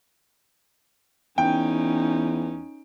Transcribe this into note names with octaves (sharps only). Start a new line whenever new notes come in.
E2 C#4 D#4 G5